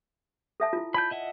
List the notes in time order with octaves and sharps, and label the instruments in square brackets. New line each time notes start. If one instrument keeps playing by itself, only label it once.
[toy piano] A4 E5 A5
E4 F4
[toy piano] D5 A5 [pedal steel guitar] B5 G6
[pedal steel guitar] D#5 E5 F#5